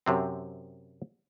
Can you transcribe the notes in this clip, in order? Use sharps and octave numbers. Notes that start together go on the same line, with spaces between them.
F#2 C3 C4